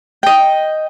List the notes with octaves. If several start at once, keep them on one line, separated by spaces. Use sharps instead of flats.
D#5 G5